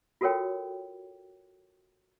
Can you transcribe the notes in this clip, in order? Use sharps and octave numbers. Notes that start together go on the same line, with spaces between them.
F4 F#4 A4 A#4 C#5 G5